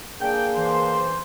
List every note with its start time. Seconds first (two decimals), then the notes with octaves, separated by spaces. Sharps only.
0.21 A#3 D4 G#4 G5
0.55 E3 C5